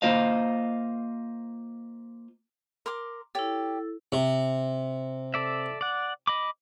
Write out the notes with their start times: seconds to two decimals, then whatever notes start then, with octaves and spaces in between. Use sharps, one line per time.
0.02 A#3 F4 C5 D#5 F5
2.86 A#4 C6 D6
3.35 E4 G4 A4 C#5
4.12 C3
5.34 A4 D5 E5
5.81 D5 F#5
6.27 D#5 B5 D6